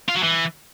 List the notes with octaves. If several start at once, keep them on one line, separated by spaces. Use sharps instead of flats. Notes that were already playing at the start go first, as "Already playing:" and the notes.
F4
F#3
E3